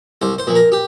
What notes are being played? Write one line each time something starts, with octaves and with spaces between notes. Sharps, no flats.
C2 C5
C5
A#2 F3
A#4
G4